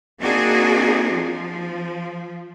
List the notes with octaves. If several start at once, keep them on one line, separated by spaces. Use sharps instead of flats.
A#3 C4 D4 D#4 F#4 G#4
F3